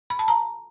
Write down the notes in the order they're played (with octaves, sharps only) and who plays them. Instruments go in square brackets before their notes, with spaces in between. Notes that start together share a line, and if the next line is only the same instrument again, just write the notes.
[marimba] B5
A5
A#5